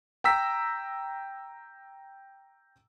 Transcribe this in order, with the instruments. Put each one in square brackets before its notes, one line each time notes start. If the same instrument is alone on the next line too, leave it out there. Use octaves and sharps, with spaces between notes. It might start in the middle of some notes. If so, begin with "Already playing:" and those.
[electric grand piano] G5 A#5 E6 B6